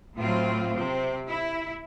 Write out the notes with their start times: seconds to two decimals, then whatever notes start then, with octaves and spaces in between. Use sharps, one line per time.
0.17 A2 F#3 C4 F4
0.77 C3 C4
1.28 E4